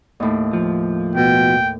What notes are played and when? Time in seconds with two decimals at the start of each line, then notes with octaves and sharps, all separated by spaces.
0.20 D#2 A2
0.53 F3
1.16 B2 G5